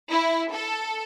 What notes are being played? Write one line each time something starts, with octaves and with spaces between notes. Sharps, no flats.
E4
A4